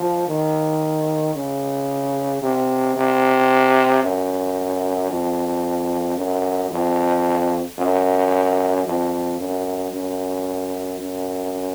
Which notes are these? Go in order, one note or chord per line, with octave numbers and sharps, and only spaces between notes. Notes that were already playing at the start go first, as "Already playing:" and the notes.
Already playing: F3
D#3
C#3
C3
C3
F#2
F2
F#2
F2
F#2
F2
F#2
F#2
F#2